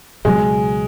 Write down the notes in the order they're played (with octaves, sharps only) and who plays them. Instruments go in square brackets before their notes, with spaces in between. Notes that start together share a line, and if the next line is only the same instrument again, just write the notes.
[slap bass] C#2 B2 F#3 [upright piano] G#3